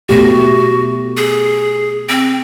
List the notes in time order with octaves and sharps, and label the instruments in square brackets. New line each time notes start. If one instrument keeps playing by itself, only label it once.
[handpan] B2 A3 G4 [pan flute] F#4
[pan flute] G#4
C4